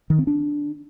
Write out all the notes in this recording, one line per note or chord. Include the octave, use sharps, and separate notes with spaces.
D#3
C4
D4